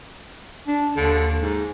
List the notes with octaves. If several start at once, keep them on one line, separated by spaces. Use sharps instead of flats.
D4
D#2 D3
G#2